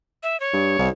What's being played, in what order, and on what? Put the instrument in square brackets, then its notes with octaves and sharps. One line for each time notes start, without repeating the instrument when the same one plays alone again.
[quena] E5
C#5
[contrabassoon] G2
C2